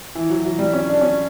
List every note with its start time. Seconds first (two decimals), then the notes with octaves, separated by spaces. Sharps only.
0.15 E3
0.30 F#3
0.40 E3
0.45 F#3
0.59 G3
0.73 C#4
0.89 D4
1.01 C#4